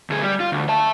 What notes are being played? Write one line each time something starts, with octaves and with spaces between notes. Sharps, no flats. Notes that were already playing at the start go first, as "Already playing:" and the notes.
D2 G#4
G3 G4
F4
D2
E5 A5